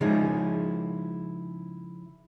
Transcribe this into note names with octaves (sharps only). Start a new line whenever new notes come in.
C#3 F3 G#3 D#4 E4 G#4